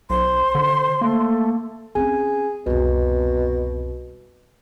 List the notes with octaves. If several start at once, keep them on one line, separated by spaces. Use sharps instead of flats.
B1 C5 C6
D3
A3 A#3
C4 C#4 G#4
C2 F2 B2